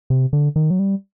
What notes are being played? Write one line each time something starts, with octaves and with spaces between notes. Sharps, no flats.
C3
D3
D#3
F#3
G3